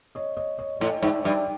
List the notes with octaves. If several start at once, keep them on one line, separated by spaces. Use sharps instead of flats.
C#5 D#5
C#5 D#5
C#5 D#5
D5
A2 C#5 D#5
G#2 D5 E5
G2 D5 E5